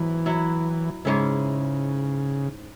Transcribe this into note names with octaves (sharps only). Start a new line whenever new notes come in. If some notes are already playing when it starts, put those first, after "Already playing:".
Already playing: G#2 E3 F#3 B3
F#3 E4
G#2 C#3 G#3 C#4 E4